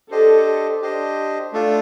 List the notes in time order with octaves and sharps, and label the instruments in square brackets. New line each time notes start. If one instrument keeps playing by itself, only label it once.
[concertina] D4 G4 C5 D#5 [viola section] A4
[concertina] D4 G4 C5 D#5
A3 D4 F4 A4